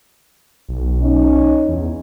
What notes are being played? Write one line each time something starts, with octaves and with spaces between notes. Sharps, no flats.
B1
C#4 D#4
E2